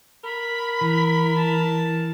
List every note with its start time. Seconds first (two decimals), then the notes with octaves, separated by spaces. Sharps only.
0.24 A#4 B5
0.81 E3
1.36 A5